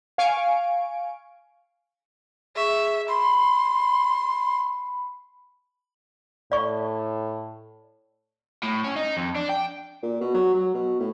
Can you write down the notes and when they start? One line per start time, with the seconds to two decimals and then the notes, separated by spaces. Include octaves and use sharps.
0.18 F5 G#5 C#6 D7
2.56 G#4 E5 C#6
3.08 B5 C6
6.52 A2 D5 C#6
8.63 A2
8.84 C#4
8.96 D#4
9.17 F2
9.35 D4
9.49 G5
10.02 A#2
10.21 B2
10.34 F#3
10.54 F#3
10.74 B2
11.00 A2